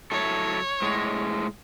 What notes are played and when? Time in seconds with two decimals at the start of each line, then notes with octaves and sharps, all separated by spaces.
0.12 F#3 E4 A4 C#5
0.82 A2 G#3